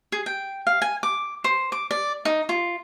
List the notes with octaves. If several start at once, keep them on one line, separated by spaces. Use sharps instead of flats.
G#4
G5
F5
G#5
D6
C5
D6
D5
D#4
F4